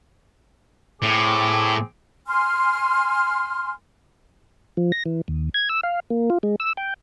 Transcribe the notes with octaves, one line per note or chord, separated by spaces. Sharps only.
A2 C4 G#4 D6
G#5 C6 F6
F3
A#6
E3
D#2
G#6
E6
F5
A#3
F4
G#3
E6
G5